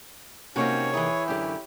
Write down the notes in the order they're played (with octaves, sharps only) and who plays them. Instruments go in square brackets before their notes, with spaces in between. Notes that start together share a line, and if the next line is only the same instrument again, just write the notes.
[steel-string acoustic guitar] C3 A#3 D#4 [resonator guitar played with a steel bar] C4 F#4 [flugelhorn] C#4 [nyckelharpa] C#5
[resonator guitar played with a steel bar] E3 G#4 [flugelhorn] E4
[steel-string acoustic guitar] F#2 D3 [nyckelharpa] G4